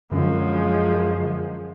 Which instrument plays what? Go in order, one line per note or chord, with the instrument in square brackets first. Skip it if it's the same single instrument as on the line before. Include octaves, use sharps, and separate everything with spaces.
[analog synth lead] F#2 [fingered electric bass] D3 F#3 C#4 [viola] F3 G#3